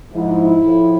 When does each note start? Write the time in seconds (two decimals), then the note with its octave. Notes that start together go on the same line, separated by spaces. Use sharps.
0.11 G#2 F3 E4
0.61 A2 F3